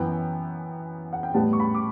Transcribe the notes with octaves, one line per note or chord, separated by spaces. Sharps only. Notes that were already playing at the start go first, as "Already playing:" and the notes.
Already playing: F#2 E3 B3 G5
F#5
G5
A2 G3 B3 A5
C#6
B5
D6